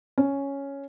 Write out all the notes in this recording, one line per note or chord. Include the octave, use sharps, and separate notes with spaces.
C#4